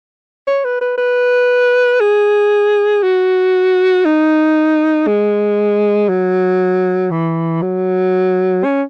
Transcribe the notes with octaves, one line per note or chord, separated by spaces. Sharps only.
C#5
B4
B4
B4
G#4
F#4
D#4
G#3
F#3
E3
F#3
C#4